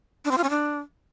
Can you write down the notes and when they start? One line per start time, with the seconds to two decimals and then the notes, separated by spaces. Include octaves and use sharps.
0.25 D4
0.31 C4
0.37 F4
0.44 C#4
0.50 D4